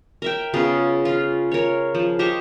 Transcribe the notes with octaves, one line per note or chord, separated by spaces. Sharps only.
A#4 E5 G5
C#3 B3 F4 G#4
F4
A#4 C#5
F3
G4 C5 D#5 C#6